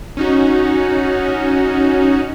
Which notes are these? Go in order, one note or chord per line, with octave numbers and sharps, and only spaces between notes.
C#4 D#4 F#4